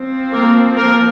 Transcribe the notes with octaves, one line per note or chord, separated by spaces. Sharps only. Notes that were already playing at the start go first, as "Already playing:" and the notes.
Already playing: F3 C4
A#3 A#4
A#3 A#4